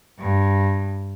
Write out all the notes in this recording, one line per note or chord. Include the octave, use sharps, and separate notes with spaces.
G2